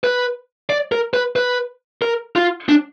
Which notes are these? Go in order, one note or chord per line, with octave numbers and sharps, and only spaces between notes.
B4
D5
A#4
B4
B4
A#4
F4
D4